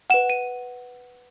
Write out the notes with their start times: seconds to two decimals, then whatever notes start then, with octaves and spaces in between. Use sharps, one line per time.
0.10 B4 F#5 E7
0.30 D#7